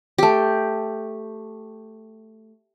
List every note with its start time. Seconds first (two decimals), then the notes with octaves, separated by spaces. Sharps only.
0.18 A3 G4